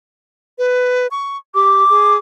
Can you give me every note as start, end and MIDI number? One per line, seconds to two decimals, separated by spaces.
0.59 1.07 71
1.11 1.37 85
1.55 1.84 67
1.55 2.15 86
1.90 2.17 68